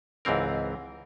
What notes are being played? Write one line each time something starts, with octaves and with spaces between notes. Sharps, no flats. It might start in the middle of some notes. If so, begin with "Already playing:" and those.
C#2 G#2 E3 C4 A#4